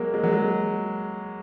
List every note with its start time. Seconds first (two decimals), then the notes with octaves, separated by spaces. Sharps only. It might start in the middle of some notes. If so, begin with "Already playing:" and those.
Already playing: F#3 G#3 A#3
0.14 G#3
0.24 F#3
0.33 G#3